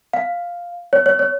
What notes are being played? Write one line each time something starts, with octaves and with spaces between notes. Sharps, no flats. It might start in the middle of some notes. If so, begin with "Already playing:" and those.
F5
C#5
C#5
C#5